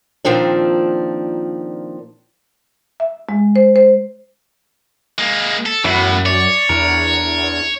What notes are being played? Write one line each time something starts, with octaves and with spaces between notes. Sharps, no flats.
A#2 D#3 F3 C4 D4
E5
G#3
C5
C5
G#3 A#3
A4
F#2 A2 E3 B3 F#5
C#5 D5
E2 D4 A#4